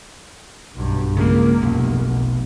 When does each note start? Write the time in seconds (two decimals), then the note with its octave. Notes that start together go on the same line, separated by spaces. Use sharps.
0.75 B1 G2
1.16 C#3 G#3 A#3
1.62 F1 B1